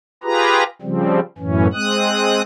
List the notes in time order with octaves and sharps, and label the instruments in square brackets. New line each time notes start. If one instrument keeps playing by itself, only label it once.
[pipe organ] F4 G4 G#4 B4 A#5
C#3 F3 G3 C4
F#2 A2 E3 C#4
G#3 C4 D#6 F#6